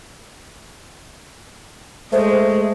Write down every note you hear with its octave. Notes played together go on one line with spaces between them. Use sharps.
G#3 A3 C5